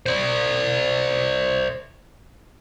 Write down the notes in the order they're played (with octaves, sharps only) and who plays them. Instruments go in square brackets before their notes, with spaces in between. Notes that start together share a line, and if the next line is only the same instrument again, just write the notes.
[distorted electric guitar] C5 D5